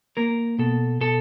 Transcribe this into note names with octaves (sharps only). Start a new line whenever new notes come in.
A#3 A#4
B2 A4
B2 A4